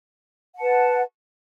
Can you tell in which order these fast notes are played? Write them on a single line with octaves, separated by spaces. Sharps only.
F#5 A5 B4